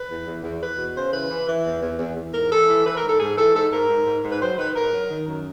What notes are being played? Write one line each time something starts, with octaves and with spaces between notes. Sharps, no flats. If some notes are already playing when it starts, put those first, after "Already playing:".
Already playing: B4
E2
E2
E2
E2 B4
B2
C#3 C5
E3 B4
E3
E3
E2
E2
E2
E2
G#2 A#4
E3 A4
E3
E3 B4
A#4
G#2
A4
G#2 G#4
E3 A4
G#2 A4
G#2 A#4
G#2
G#2
G#2
B4
F#3 C5
D#3 B4
G#2 A#4
F#3
D#3
F#2